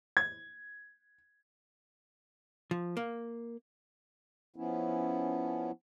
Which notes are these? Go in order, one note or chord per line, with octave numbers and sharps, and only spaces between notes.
G#6
F3
A#3
F3 B3 C#4 E4